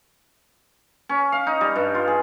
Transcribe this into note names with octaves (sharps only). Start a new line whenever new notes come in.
C#4
F5
D#4
G3
G2
F4
G#4